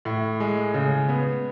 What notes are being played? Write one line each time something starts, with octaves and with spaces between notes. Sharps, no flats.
A2
G#3
C#3
B3